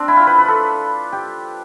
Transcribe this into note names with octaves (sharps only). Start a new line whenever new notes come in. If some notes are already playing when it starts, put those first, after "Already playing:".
Already playing: C4 D4
E4
F4
B4
B4
A4
G4